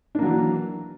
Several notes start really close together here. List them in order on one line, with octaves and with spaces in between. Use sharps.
D4 A#3 F#3 E3